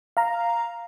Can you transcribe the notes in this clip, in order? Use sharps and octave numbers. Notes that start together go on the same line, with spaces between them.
F5 A#5